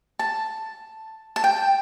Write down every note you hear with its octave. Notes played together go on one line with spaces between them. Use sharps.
A5
A5
G5